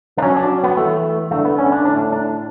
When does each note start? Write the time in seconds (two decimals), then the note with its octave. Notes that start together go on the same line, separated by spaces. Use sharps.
0.18 D4
0.23 F#3 C#4
0.36 D4
0.64 B3
0.77 E3 A3
1.31 D3 A3
1.45 B3
1.58 C#4
1.72 D4
1.85 A2 D4
1.99 D4
2.13 D4